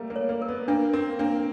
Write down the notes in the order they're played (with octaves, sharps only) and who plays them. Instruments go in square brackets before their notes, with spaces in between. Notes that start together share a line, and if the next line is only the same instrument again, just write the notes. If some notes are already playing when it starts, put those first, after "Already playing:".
Already playing: [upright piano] G3 A3 A#3
A#3
[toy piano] C#5
[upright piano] A#3
[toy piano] A#4
[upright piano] B3
[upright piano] A#3 [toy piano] D4
[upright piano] C4 [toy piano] A#4
[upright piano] A#3 [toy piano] D4